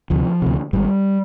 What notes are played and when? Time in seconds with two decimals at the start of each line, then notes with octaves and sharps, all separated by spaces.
0.10 D2 C3 F3
0.42 D2 C3
0.73 G#1 G#2 G3